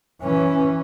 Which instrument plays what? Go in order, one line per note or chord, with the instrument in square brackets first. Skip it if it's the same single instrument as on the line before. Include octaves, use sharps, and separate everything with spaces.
[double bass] E3 C#4